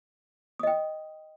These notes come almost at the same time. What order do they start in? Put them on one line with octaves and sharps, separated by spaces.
D#6 D#5 G5